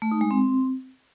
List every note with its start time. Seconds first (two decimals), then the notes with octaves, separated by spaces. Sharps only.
0.02 A3
0.11 D#4
0.21 G#3
0.31 C4